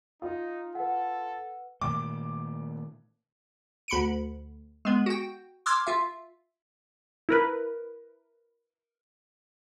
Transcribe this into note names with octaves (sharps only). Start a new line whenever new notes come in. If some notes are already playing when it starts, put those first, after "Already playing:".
D#4 F4
A4 B4 F#5
A#2 D#3 A3 D6
D2 B5 C#7 D7
G#3 B3
F#4 G5
C6 D6 E6 F6 G#6
F4 E5
E4 A#4 B4